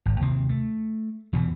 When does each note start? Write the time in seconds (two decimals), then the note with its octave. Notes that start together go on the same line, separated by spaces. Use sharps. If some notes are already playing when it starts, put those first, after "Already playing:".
0.06 G#1
0.21 D#2 C3 C4
0.49 A3
1.33 E2 B2 D3 E3